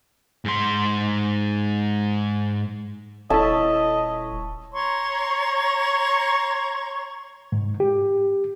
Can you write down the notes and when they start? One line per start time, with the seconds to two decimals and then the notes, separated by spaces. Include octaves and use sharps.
0.45 G#2 C6
3.30 D#1 E4 A4 C#5 D#5 E5 A5
4.72 C#5 A#5 C6 C#6
7.52 G#2
7.80 G4